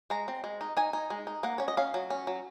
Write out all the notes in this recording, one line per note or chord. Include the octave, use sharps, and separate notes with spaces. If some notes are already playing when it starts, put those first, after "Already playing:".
G#3 A#5
C4
G#3
D#4
D#4 G#5
D#4
G#3
D#4
A#3 F#5
C#4 C#5
D#5
C#4 F5
F#3
C#4
F#3